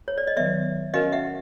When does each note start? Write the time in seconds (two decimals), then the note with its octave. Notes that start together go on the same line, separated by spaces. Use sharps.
0.08 C#5
0.18 D5
0.27 D#5
0.36 D#3 F#3 B3 D5 E5
0.94 C#4 F#4 A#4 C#5 D#5 F5
1.12 E5 F#5